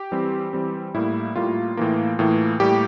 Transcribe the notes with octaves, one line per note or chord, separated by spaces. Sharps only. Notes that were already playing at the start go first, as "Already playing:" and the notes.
Already playing: G4
E3 G3 C4
E3 G3 C4
A2 G3 A#3 E4
A2 G3 A#3 F4
A2 E3 A#3
A2 E3 A#3
A2 G3 A#3 G4